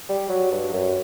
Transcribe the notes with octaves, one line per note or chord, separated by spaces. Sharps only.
G3
F#3
G2
F#2